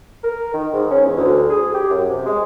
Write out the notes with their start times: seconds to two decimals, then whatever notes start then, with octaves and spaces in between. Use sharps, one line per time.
0.24 A#4
0.54 D#3
0.73 G#2
0.91 C#4
1.05 E2
1.17 D2
1.49 G#4
1.74 G4
1.90 F#2
2.09 C3
2.26 G#3